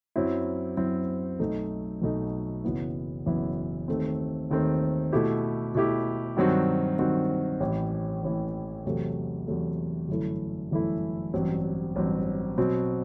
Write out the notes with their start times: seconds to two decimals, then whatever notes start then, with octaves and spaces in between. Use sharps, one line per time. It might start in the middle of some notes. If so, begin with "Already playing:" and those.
0.16 F#2 F#3 C4 E4
0.77 F#2 F#3 C4 E4
1.40 B1 B2 A3 D#4
2.02 B1 B2 A3 D#4
2.64 F#1 F#2 E3 B3 E4
3.26 F#1 F#2 E3 B3 E4
3.88 D#2 D#3 A3 C4
4.50 D#2 D#3 A3 C4
5.13 B2 A3 E4 G4
5.75 B2 A3 E4 G4
6.37 G2 D#3 F#3 C4 F#4
6.98 G2 D#3 F#3 C4 F#4
7.60 A1 A2 E3
8.22 A1 A2 E3
8.85 E2 C3 F#3 A3
9.47 E2 C3 F#3 A3
10.09 G1 F#2 E3 A3 E4
10.71 G1 F#2 E3 A3 E4
11.34 A1 G2 F#3 C4
11.96 A1 G2 F#3 C4
12.58 B2 F#3 C4